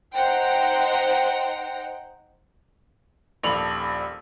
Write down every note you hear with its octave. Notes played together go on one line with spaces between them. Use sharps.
D#4 C5 F#5 G5 A#5
D#1 A#1 A4 B5 F7 F#7